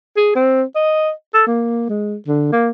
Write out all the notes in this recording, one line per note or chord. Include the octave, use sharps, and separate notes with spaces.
G#4
C4
D#5
A4
A#3
G#3
D3
A#3